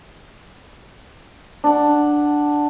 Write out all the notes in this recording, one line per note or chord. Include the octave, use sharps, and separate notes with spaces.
D4 F#5